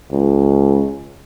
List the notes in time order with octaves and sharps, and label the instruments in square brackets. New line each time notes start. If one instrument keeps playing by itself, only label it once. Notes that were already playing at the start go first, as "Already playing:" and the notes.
[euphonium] C#2